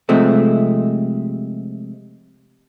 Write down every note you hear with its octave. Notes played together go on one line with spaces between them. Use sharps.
C3 F3 G#3 A3 C4